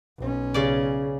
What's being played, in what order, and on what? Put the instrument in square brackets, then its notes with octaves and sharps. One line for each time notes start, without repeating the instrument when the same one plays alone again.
[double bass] B1 C#4
[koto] C#3 D5